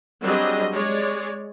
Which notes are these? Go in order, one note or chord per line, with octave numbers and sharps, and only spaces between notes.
F#3 G3 C4 D4 G#4 D#5
G#3 C#5 D5